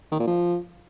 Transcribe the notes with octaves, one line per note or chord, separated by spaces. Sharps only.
D#3
A#2
F3